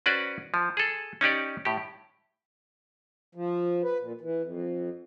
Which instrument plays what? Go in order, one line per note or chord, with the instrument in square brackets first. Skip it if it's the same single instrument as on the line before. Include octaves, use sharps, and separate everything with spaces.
[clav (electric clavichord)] C#4 F#4 B4 C5 D5
F3
G#4 A4
C#4 D#4 G4 D5
A2 G4
[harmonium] F3
B4
A#2
E3
F2